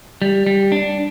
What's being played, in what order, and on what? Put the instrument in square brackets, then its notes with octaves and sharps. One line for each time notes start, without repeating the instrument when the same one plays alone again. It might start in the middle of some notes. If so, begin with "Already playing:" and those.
[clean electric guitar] G3
G3
D4